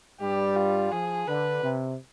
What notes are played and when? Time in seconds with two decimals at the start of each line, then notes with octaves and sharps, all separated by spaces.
0.21 G2 G3 G4
0.56 F4
0.91 F3 G#4
1.27 D3 B4
1.62 C3